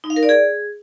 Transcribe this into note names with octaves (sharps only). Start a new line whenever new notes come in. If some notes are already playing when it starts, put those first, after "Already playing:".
D#4
F5
A#4
D5
G#4